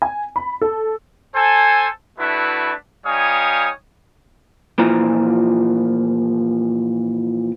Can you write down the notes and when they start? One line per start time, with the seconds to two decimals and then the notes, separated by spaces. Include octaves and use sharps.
0.02 G#5
0.36 B5
0.61 A4
1.35 A4 C5 G#5
2.19 A3 D4 E4 F#4 B4
3.06 G3 D#4 C#5 F5 G#5 D#6
4.78 A#2 E3 F3 A#5